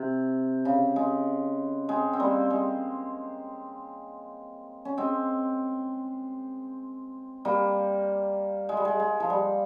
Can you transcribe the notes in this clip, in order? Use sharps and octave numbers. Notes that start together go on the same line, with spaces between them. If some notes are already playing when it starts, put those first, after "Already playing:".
Already playing: C3
C#3
G#3
G#3 C4
C4
G3 A#3
G#3
C#4
G#3 C4
G3 A#3
G#3
G3
G#3
G#3
F3
G3